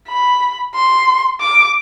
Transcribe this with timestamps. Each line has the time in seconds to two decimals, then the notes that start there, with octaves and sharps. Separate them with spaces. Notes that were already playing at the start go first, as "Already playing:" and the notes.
0.08 B5
0.75 C6
1.41 D6